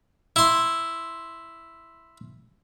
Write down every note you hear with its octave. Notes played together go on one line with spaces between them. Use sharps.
E4 C6